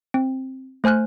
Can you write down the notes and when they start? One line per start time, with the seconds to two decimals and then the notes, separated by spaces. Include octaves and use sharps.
0.14 C4
0.84 A3 C5 G#5 F6 F#6